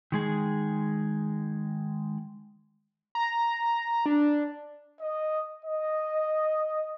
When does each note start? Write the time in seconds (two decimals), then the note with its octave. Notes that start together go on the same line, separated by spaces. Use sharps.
0.12 D#3 G#3 G#4
3.15 A#5
4.06 D4
5.01 D#5
5.64 D#5